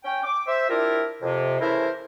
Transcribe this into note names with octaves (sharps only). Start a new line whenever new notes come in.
C#4 G5
D6
C5 E5
G3 D4 E4 F4 A#4
F2 C3
C#3 E3 A3 E4 A#4 C5